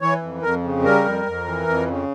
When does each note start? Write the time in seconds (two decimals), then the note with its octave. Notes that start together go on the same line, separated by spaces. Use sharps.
0.01 E3 C#5
0.22 F2
0.42 F2 A#4
0.64 C#3
0.84 G3 A#4
1.05 F2
1.26 F2
1.46 E3
1.67 F2
1.88 C#3